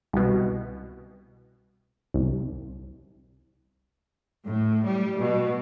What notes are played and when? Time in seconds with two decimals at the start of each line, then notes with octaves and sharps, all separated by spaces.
0.13 C2 B2
2.14 C2
4.46 A2
4.84 G3
5.19 B2